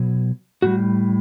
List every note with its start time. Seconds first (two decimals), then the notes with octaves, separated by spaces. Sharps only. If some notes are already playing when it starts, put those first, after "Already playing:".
Already playing: B2 F#3
0.62 A2 G3 F#4